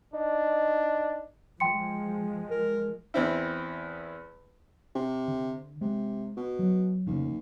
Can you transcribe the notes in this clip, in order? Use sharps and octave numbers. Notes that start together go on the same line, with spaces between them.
D4 D#4
F3 G#3 G5 C6 C#7
A#4
E2 C4 E4
C3
D3
C3 G#3
B2
F#3
F1 D#2 C#3 F3